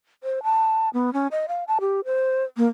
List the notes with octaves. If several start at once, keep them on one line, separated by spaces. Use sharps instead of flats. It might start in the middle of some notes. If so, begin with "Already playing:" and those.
C5
A5
B3
C#4
D#5
F5
A5
G4
C5
A#3